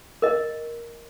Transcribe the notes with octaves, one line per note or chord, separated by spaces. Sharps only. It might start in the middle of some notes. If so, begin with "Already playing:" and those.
A#4 D#5